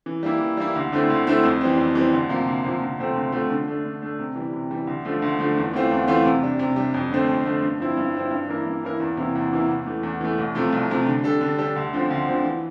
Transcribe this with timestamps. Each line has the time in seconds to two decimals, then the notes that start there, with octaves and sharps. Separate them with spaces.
0.06 E3
0.23 G3 A#3 E4
0.40 E3
0.57 G3 A#3 E4
0.75 D2
0.92 D3 A3 C4 E4
1.10 D2
1.27 D3 A3 C4 E4
1.43 F2
1.61 E3 G3 C4
1.78 F2
1.95 E3 G3 C4
2.13 D2
2.29 C3 F3 A#3
2.47 D2
2.63 C3 F3 A#3
2.81 D2
2.99 C3 F3 A3 C4
3.15 D2
3.32 C3 F3 A3 C4
3.50 D3
3.68 A3 D4
3.84 D3
4.01 A3 D4
4.19 C3
4.36 E3 G3
4.53 C3
4.71 E3 G3
4.87 D2
5.05 D3 F3 A3
5.22 D2
5.39 D3 F3 A3
5.57 E2
5.73 E3 A3 C4 F4
5.91 E2
6.08 E3 A3 C4 F4
6.25 C3
6.43 G3 D4
6.59 C3
6.76 G3 D4
6.94 F2
7.11 D3 A3 C4
7.28 F2
7.45 D3 A3 C4
7.62 G2
7.80 F3 C4 E4
7.97 G2
8.15 F3 C4 E4
8.31 G2
8.48 E3 A#3 E4 A#4
8.67 G2
8.83 E3 A#3 E4 A#4
9.00 E2
9.17 C3 E3 A#3 E4
9.35 E2
9.52 C3 E3 A#3 E4
9.69 E2
9.86 E3 A3
10.03 E2
10.21 E3 A3
10.38 C2
10.55 C3 F3 A3
10.72 C2
10.90 C3 F3 A3
11.06 D3
11.24 G3 D4 A4
11.41 D3
11.58 G3 D4 A4
11.76 D2
11.93 D3 F3 C4
12.10 D2
12.27 D3 F3 C4
12.44 E3